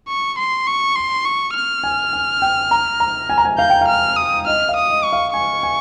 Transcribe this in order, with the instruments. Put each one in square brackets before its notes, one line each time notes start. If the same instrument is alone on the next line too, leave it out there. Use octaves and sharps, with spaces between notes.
[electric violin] C#6
C6
C#6
C6
C#6
F6
[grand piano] G#5
G#5
G5
A#5
A#5
G#5
A#5
G#5
[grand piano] F5 [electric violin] G6
[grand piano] G5
F5
[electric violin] F6
D#6
[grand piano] D#5 [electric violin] F6
[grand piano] F5
[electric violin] D#6
[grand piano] D#5
[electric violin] C#6
[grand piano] F5
[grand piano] G#5 [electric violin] C#6
[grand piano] G#5